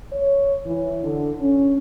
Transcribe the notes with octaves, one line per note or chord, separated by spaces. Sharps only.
C#5
E3
D3
C#4